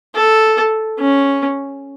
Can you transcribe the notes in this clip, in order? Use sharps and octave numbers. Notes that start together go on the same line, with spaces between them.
A4
C#4